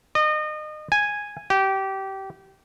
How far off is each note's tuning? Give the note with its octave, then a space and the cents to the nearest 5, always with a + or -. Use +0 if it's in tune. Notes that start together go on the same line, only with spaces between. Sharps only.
D#5 -30
G#5 -5
G4 -20